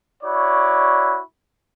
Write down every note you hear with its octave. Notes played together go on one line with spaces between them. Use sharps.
E4 F#4 C#5 D5